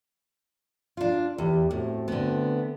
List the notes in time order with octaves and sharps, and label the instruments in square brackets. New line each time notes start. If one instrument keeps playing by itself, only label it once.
[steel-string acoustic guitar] D4 F4
[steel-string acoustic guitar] E2 [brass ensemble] G4
[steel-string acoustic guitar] A2 [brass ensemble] A3 C4 F#4
[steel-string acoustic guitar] D3 B3